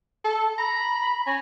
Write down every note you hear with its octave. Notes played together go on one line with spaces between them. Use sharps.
A4
A#5 B5
C#4 A#6